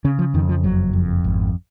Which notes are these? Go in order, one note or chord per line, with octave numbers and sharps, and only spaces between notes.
C#3 C#4
F3
F2 D#3
F3
F#1 F#3
F2
G#1